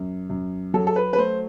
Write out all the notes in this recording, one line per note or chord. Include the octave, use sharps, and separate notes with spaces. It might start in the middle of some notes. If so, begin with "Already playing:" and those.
Already playing: F#2
F#2
F#3 A4
A4
B4
B4
A3 C5